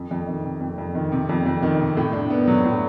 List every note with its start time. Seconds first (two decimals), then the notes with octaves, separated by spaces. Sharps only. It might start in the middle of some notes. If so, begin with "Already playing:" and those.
Already playing: F2
0.11 F2
0.27 D#3
0.44 C3
0.61 F2
0.78 F2
0.95 D#3
1.12 C3
1.29 F2
1.46 F2
1.63 D#3
1.80 C3
1.97 A2
2.13 D4
2.30 B3
2.48 F#3
2.65 A2